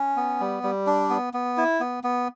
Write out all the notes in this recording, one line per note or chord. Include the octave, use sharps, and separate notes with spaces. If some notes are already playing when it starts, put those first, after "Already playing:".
Already playing: C#4
B3
G3
G3
D4
B3
B3
E4
B3
B3